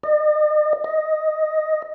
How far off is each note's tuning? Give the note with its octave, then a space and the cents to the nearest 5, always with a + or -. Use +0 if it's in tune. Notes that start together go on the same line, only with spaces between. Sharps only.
D#5 -45
D#5 +5